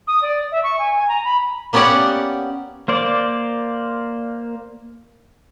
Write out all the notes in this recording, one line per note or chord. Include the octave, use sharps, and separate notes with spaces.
D#6
D5
E5
C#6
G#5
G#5
A#5
B5
A#3 B3 C#4 G4 D5 F#5
A#3 C5 D5